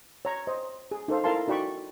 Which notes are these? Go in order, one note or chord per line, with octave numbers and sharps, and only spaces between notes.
C#5 A#5
C5 D#5
G#4
D#4 A4 C5 F5
E4 A4 A#4 F5 A5 C6
D#4 F#4 D5 G5 B5 C#6